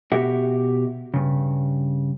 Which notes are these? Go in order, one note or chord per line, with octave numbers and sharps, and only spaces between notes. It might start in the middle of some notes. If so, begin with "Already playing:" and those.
B2 F#4 G4 E5 F#5
G2 C#3